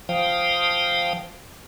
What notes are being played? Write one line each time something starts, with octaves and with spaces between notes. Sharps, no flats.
F3 F5 G5 D#6